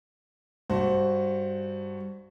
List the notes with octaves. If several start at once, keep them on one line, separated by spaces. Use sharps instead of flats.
G2 F#4 C5